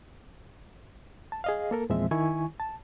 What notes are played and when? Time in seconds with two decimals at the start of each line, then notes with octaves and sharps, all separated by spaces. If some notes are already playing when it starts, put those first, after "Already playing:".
1.32 A5
1.44 G#4 D#5 F5
1.71 A#3 A4 A#4
1.90 E2 A#2 F3 G#3 C4 E5
2.11 D#3 E4 G#5 C#6
2.60 A5